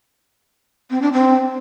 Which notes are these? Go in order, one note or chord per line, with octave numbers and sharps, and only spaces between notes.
C4
D4
C4